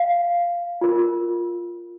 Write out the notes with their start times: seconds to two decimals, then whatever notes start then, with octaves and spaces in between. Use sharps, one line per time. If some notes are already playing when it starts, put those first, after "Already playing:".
Already playing: F5
0.81 F4 A#4